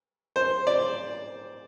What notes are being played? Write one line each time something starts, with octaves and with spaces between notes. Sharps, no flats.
C5
D5